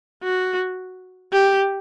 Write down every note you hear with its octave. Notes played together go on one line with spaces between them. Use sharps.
F#4
G4